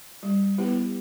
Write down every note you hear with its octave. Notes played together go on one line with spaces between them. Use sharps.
G3
B3 E4 G4 B4